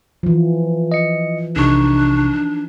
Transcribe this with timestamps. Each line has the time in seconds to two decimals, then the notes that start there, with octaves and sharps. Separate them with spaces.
0.23 E3 F3
0.92 D#5 C#7
1.56 B1 C3 D4 D#4 C#6